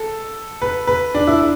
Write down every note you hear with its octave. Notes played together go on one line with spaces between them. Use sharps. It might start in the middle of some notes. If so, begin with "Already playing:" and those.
Already playing: A4
B4
B4
D4
E4
D4